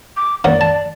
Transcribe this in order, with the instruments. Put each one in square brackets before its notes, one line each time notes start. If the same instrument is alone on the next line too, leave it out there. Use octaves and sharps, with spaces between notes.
[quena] D6
[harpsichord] A#3 C#4 F#5 [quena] D5
[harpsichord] A5